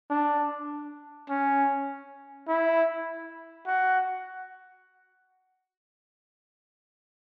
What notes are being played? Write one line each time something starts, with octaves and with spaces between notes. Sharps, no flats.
D4
C#4
E4
F#4